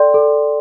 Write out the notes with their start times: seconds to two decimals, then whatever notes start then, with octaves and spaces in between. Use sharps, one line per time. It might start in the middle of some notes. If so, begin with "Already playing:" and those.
Already playing: A4 D5 G5 C6
0.14 A4